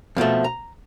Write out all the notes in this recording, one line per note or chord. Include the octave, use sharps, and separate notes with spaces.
F2 B2 F3 A3
A#5